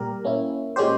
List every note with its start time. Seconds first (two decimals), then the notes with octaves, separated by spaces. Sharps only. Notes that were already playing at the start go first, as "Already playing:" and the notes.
Already playing: A#2 G3 G4 A#4
0.24 A#3 C#4 E4
0.76 A#2 G#3 C#4 G4 C5